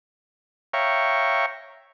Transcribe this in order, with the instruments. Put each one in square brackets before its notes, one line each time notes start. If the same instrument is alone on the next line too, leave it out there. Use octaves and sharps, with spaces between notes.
[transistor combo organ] C#5 E5 F5 G5 A#5 C#6